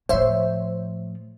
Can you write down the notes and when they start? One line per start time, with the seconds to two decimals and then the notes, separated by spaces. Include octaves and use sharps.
0.09 A2 F3 C5 C#5 E5